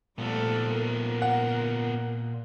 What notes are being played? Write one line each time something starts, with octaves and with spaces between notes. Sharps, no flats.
A#2 F3 G3 A3 B3 A4
A#4
F#5